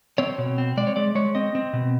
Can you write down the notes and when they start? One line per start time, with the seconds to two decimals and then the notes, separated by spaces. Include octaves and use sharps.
0.18 C4 C#5
0.38 B2
0.58 C4
0.77 G#3 D5
0.87 C#5
0.96 G#3 D5
1.15 G#3 C#5
1.35 C4 D#5
1.55 C4
1.73 B2